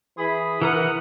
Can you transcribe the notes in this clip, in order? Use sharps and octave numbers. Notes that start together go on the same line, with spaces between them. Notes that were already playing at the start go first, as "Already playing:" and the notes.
E3 G#4 B5
E3 A#4 F#5 A#5 D#6